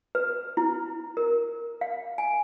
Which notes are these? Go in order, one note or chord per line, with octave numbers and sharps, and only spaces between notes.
B4
E4
A#4
F5
G#5